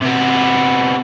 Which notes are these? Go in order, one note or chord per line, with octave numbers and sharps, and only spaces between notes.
C3 B3